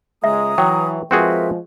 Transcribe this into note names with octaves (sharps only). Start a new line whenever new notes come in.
C#2 C#3 G#3 E5 A#5 D#6
E3 F#3 G5
F3 G#3 C4 F#4 G#4 A#4 B4 E5